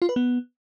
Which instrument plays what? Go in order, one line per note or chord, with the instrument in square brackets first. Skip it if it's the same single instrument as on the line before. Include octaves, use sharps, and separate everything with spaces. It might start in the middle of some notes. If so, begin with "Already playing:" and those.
[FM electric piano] F4
B4
B3